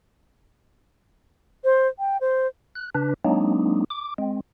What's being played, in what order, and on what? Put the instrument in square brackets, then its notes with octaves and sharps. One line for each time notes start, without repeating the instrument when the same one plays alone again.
[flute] C5
G5
C5
[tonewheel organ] F#6
C#3 D4 B4
F#3 G#3 A#3 C4 D4 D#4
D6
G#3 C4